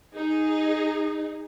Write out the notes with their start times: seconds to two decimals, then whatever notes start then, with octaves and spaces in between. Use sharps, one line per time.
0.13 D#4 G#4